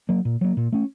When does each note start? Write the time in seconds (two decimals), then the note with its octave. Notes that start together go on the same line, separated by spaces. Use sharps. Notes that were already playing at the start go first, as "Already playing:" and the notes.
0.09 F#3 A#3
0.25 A#2
0.41 F#3 A#3
0.57 A#2
0.72 A3 C#4